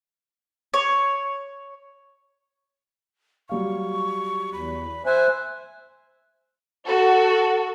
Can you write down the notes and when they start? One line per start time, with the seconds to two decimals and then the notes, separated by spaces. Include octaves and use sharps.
0.74 C#5
3.49 F#3 G3 F5 C#6
4.53 E2 B5
5.06 C5 E5 G#5 F#6
6.85 F#4 A4